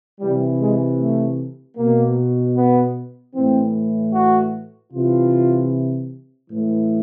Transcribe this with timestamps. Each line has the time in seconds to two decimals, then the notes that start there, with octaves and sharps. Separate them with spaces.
0.20 C3 E3 G3
0.60 G#3
1.00 A3
1.77 B2 A#3
2.56 B3
3.35 A2 E3 C4
4.14 F#4
4.92 C3 E3 F4
6.50 A2 E3